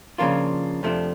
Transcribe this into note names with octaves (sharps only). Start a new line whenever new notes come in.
C#3 F3 A#3 D4 F4
F2 C3 F3 A3 D4